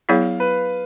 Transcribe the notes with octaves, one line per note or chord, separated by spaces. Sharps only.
F#3 B3 E4 G#4 C#5 F5
B4